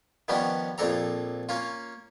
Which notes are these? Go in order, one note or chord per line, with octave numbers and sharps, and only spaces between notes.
D#3 F3 G3 B3 C#4 D4
A#1 F2 D4 A4 A#5
A#3 C#4 F4